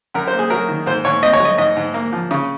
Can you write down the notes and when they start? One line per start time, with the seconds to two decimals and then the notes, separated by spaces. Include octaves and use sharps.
0.14 F#2 A#4
0.28 C5
0.33 A#3
0.39 G#4
0.50 F#3 A#4
0.68 D#3
0.86 G#2 C5
1.05 G#2 C#5
1.23 C4 D#5
1.33 C#5
1.40 F#3
1.45 D#5
1.58 G#2 D#5
1.76 G#2
1.94 A#3
2.13 F3
2.31 C#3